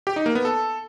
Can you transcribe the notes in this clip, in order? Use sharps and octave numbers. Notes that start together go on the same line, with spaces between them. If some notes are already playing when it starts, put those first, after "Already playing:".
G4
D#4
A#3
B3
A4